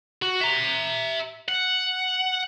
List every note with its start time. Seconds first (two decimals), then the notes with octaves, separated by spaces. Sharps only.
0.22 F#4
0.41 E5 A#5
1.48 F#5